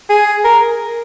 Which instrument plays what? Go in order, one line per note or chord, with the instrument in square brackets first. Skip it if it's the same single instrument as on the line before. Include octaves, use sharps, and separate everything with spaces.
[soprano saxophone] G#4
A#4